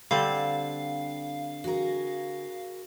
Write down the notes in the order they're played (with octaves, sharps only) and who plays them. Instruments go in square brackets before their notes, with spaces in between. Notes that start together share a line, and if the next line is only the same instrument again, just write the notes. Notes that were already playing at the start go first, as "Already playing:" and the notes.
[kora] D3 G3 C4 [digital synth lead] F5
[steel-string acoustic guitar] F#4 G#4 A#4